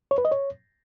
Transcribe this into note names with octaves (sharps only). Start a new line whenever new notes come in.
C#5
B4
D#5
C#5